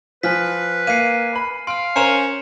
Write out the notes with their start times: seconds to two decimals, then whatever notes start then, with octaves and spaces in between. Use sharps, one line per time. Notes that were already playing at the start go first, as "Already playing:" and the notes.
0.23 F3 B4 G#5 F6 B6
0.87 A#3 C7 C#7 D#7
1.33 B4 B5
1.67 F5 C6 F6 D7
1.96 C#4 A#4 C5 A#5 C#7 E7 F7